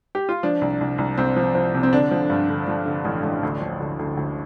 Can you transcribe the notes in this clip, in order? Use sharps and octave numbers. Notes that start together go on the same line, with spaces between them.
G4
F4
F3 D4
C2
C2
C2
C2 C4
F3
F3
C3
C4
D3 D4
F3
G2
D3
F3
D3
A1
A1
D2
F3
D2
D2
D2